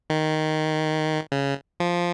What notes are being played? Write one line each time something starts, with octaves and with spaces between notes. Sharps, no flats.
D#3
C#3
F3